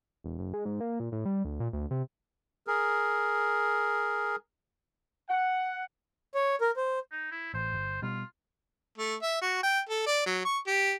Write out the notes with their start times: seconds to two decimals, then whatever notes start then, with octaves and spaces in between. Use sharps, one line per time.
0.24 E1
0.39 F#1
0.54 G#3
0.65 G#2
0.81 A#3
1.00 A#2
1.12 A2
1.25 G3
1.45 D2
1.60 A#2
1.73 D2
1.91 C3
2.67 G#4 A#4
5.27 F#5
6.35 C#5
6.61 A#4
6.76 C5
7.11 D#4
7.31 E4
7.54 A1 C5
7.73 G1
8.02 B2 G3 F4
8.98 A3
9.22 E5
9.42 F#4
9.63 G5
9.89 A4
10.06 D5
10.26 F#3
10.45 C#6
10.67 G4